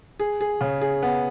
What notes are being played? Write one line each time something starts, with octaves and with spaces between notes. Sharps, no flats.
G#4
G#4
C#3
G#4
B3